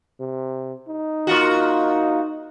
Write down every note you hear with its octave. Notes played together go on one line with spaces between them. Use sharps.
C3
D#4
A#3 F4 F#4